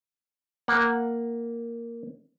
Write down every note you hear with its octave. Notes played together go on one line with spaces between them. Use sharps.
A#3 F#5